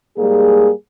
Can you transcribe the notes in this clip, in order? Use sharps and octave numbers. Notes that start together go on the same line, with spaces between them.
G#2 G3 A#3 G#4